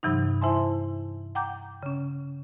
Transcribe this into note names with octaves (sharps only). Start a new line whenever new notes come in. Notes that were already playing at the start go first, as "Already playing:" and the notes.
G2 C3 E3 F#3 D#4
E4 C5 E5 G#5 A5 C6
F#5 G5 A#5 D6 G6
C#3 C#4